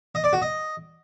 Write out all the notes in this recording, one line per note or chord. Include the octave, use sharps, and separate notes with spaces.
D#5
D5
F#4
D#5